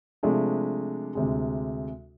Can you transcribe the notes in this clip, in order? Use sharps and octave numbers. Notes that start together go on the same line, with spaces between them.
C3 F3 G#3 A3 D4
D2 C3 G#3